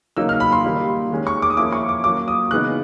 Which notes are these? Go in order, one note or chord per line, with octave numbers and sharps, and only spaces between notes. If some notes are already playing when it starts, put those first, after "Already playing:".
C#3 F#3 A#3 D#4 E6
F6
B5
C6
D#3 G3 A#3 D#4
D#3 G#3 C#4
C#6
D6
D#6
F3 A#3 C#4 E4 D6
C#6
D6
F#3 A#3 C#4 D6
D#6
C#3 E3 G#3 B3 D#4 F#6